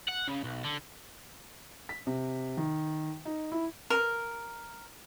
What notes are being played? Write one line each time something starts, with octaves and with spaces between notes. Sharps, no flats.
F#5
C#3
B1
D3
B6
C3
D#3
D#4
E4
A#4